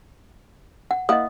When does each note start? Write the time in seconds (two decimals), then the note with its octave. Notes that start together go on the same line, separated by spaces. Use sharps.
0.91 F#5
1.09 A#3 E4 D#5 F#5 D#6